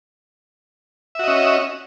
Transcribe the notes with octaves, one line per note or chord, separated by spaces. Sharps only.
C#4 F#4 D#5 E5